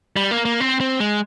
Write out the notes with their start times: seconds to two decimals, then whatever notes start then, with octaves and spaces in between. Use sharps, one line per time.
0.16 G3
0.31 A#3
0.45 A#3
0.60 C4
0.80 C4
1.00 G#3